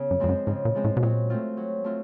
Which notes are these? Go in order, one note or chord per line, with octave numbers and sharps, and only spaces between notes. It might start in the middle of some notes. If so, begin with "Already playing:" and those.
Already playing: C#3 B3
F#2
F2 F3 G#3 C4
F#2
G#2 C#3
A#2
F3 G#3 C4
A2
B2
A#2 F#3
A3 C4 F4
F#3
A3 C4 F4